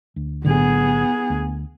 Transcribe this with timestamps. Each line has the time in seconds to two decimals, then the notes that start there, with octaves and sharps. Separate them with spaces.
0.16 D2
0.45 B1 A2 D3 B3 G#4
1.30 D2